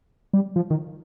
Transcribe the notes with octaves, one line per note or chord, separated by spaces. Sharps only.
G3
F3
D#3